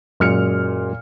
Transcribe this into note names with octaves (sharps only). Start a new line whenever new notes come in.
F#2 A#2 G#3 F6 C#7